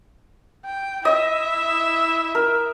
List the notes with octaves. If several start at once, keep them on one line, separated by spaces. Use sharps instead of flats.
G5
E4 D#5 E5
A#4